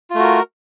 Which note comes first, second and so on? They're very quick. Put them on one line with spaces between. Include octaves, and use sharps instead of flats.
F4 A3 F#4 A#4